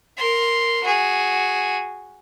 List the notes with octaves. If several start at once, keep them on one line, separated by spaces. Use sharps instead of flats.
A#4 C6
F#4 G#4